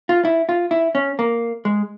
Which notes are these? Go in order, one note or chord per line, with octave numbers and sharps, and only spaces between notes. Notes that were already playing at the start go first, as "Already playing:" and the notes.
F4
E4
F4
E4
C#4
A#3
G#3